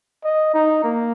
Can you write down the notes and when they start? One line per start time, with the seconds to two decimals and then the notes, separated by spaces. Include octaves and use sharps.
0.24 D#5
0.54 D#4
0.84 A#3